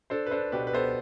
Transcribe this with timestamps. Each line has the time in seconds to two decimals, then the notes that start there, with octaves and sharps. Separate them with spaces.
0.10 D4 A4 C5
0.26 B4
0.31 D4 A4 C5
0.52 B2 G4 B4
0.67 B4
0.73 B3 A4 C5